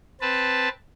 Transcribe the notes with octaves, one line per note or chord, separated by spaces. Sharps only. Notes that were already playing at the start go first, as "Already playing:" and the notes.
C4 B4 A5